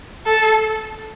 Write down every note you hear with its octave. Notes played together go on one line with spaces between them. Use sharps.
A4